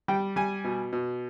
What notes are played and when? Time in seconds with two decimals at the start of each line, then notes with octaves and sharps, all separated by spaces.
0.08 G3 G5
0.36 G3 G#5
0.64 B2
0.93 B2